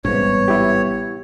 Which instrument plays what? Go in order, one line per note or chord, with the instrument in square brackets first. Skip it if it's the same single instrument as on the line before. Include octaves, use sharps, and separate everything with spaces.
[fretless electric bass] A1 G#2 C3 [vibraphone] G3 B3 B4 [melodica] C#5
[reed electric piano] E4 G4